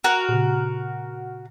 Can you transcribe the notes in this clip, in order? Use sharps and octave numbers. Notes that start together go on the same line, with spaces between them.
F#4 A#4
A#2 C#3